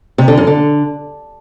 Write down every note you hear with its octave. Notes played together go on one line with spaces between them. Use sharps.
C3
D3
F#2
D3